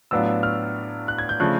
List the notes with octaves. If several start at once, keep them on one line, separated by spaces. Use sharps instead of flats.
A2 F#3 B3 D4 F4 E6
F6
F#6
G#6
G6
C#3 F3 A3 D4 F#6